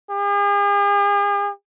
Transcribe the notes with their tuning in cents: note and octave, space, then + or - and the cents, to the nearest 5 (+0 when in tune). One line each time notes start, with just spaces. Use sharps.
G#4 -45